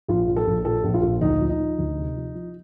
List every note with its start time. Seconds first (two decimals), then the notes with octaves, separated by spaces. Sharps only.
0.08 A#1 F4
0.28 A#2
0.36 A4
0.47 A#1
0.65 A#2 A4
0.84 A#1
0.94 F4
1.03 A#1
1.21 D2 D#4
1.41 F3
1.49 D#4
1.60 F3
1.78 D2
1.97 C3
2.16 F3
2.35 F3